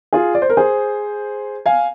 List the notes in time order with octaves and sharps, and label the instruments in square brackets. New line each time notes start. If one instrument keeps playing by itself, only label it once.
[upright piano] F4 G#4
D5
C5
A#4
G#4 C5
F5 G#5